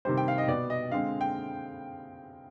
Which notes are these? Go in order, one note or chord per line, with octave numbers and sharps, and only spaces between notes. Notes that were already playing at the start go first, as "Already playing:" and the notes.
C3 D#3 G3 C5
G5
F5
D#5
B2 B3 D5
D#5
D3 G#3 C4 F5
G5